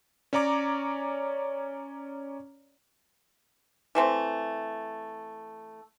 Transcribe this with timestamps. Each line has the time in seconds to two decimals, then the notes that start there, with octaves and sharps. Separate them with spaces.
0.33 C#4 C#5 D5 A#5 D6
3.95 E3 A3 C4